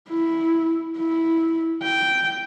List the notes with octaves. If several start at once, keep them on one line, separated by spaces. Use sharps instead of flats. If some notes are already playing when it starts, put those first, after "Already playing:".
E4
E4
G5